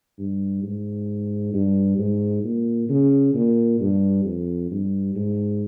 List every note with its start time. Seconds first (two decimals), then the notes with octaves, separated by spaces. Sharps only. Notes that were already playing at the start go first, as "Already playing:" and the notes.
0.18 G2
0.63 G#2
1.54 G2
1.98 G#2
2.44 A#2
2.89 C#3
3.34 A#2
3.80 G2
4.25 F2
4.71 G2
5.15 G#2